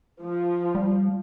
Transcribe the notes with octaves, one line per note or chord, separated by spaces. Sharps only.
F3
G3